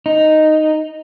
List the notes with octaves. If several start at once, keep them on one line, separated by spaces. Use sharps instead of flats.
D#4